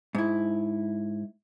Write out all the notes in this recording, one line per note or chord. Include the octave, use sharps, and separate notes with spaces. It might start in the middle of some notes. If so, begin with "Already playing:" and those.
G#2 E4